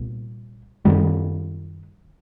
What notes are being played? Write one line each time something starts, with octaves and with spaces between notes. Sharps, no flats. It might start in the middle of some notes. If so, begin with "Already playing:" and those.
Already playing: C2 A#2
F#2 D#3 G3